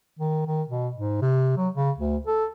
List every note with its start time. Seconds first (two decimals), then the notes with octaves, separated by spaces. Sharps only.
0.19 D#3
0.47 D#3
0.68 B2
0.96 G#2
1.22 C3
1.57 F#3
1.74 C#3
1.98 D2
2.27 A4